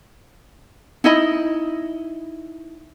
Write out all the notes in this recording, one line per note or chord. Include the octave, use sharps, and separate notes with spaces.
D#4 E4 D#5 B5